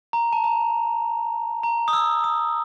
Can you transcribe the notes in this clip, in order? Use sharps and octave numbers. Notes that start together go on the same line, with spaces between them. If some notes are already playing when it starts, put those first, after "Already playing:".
A#5
A5
A#5
A#5
D#6
E6
D#6